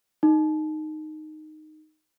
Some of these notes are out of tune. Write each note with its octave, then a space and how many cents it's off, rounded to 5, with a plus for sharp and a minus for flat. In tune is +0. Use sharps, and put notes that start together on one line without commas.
D#4 -10